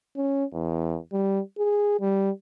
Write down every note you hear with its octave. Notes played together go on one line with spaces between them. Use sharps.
C#4
E2
G3
G#4
G3